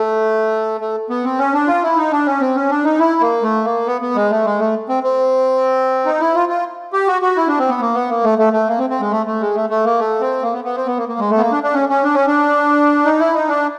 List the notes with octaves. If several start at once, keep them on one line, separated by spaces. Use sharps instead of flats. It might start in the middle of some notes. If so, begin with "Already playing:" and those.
Already playing: A3
A3
B3
C4
C#4
D4
F4
E4
D#4
D4
C#4
C4
C#4
D4
D#4
E4
A#3
A3
A#3
B3
B3
G#3
A3
G#3
A3
C4
C4
D#4
E4
F4
F4
G4
F#4
F#4
E4
D4
C4
B3
A#3
B3
A#3
A3
A3
A3
A#3
C4
C4
G#3
A3
A3
G#3
A3
A3
A#3
A3
C4
A#3
B3
B3
C4
B3
A#3
A#3
G#3
A3
B3
A#3
D4
D4
C#4
C#4
D4
C#4
D4
D#4
E4
D#4
D4